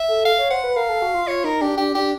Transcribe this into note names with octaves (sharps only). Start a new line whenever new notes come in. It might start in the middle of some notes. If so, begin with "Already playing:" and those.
Already playing: E5
A4
F5
C#5
C5 F#5
B4
A#4 F5
A4
F#4
F4
F4 C#5
D#4 A#4
D4 G4
D4 G4
D4 G4